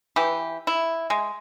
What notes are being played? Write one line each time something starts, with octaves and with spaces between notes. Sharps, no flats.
E3 G4
E4
G#3